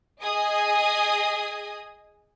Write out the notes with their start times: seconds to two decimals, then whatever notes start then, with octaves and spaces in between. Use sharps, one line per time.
0.22 G#4 D#5 G#5 D#6